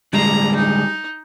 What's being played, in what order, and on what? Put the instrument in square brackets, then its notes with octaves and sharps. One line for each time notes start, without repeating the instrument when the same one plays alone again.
[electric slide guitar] D3 G3 G#3 [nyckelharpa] A#5
[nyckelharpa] D#4